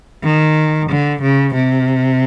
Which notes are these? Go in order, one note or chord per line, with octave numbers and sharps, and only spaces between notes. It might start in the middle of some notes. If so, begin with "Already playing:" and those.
D#3
D3
C#3
C3